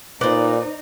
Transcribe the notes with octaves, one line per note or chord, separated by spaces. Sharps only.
A#2 D#4 B4 C5 D5